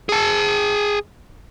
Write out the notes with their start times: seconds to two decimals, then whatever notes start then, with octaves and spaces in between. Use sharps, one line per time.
0.09 G#4 A5